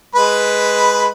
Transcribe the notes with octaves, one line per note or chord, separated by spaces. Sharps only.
G#3 B4 B5